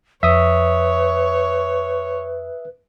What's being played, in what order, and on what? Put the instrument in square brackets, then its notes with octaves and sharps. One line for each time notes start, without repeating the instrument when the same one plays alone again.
[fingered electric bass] F2 [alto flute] B4 [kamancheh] C#5 [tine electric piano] E5 D#6